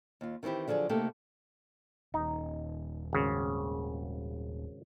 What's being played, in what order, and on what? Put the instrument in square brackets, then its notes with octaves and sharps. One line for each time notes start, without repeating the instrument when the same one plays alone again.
[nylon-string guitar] D#2 F4
D#3 E3 C4 E4 G4
D3 F3 F#3 G#4 D5
C3 A3 A#3 D#4 G4 A4
[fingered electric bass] D#1 [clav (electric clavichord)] D#4
[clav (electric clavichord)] G#1 C#3